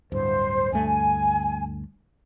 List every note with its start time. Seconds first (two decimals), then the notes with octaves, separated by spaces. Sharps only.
0.12 D1 G2 C5
0.72 D2 G2 A3 G#5